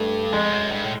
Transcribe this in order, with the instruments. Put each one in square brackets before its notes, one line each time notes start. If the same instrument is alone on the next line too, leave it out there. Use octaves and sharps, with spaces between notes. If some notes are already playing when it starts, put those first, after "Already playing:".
Already playing: [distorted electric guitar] G2 [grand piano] A3
[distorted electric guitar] F2 [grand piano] G#3
[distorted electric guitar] F#2
G2
A2